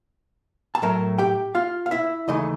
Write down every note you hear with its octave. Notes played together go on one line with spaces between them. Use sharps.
A5
A2 F#3 A3 A#4 A#5
G4 G5
F4 F5
F5
E4 E5
D#2 C#3 E3 A3 D#4 D#5